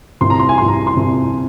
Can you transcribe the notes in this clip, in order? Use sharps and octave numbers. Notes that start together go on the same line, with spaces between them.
C2 C3 F3 C4 C6
A#5
C6
G#5
C2 C3 F3 C4 C6
A#5
C6
C2 C3 F3 C4